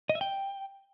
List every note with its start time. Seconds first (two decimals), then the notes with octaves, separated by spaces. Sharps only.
0.10 D#5
0.15 E5
0.21 G5